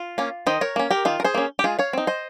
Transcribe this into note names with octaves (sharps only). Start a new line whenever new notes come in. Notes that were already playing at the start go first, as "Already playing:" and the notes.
Already playing: F4
A#3 C#4
D#3 C5 D#5
A#4 C#5
A#3 C#4
G4 A#4
D#3 F4
A#4
G#4 C5
A#3 C#4
G4
G#3 F4 G#4
C#5 F5
C4 D#4
C5 D#5